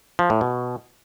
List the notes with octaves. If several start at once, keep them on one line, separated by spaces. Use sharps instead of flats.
F3
A2
B2